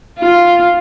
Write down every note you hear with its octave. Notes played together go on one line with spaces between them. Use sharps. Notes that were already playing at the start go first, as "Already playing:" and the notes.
F4